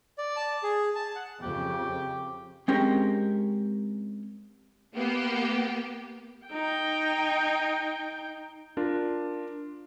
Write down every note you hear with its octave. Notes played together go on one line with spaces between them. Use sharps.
D5
A5
G#4
A5
F#5
F2 C#3 G4
G#3 C4 C#4 G4 A#4
A#3 B3 G4
D#4 G5
D4 F4 A#4